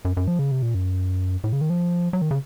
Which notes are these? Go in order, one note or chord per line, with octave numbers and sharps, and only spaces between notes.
F#2
F#2
F3
C#3
C3
A#2
F#2
A2
C#3
D#3
F3
F#3
D#3
C#3